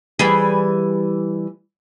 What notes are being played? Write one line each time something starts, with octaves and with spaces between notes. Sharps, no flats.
E3 G3 G#4